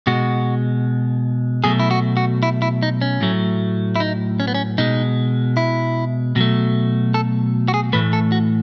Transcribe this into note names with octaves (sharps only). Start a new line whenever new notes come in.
B2 G#3 F#4
B2 F#3 A3 G#4
E4
F#4
F#4
E4
E4
D#4
C#4
A2 F#3 A3
E4
D#4
C#4
B3
C#4
B2 G#3 D#4
E4
B2 F#3 A3
A4
F#4
G#4
A2 E3 A3 B4
A4
F#4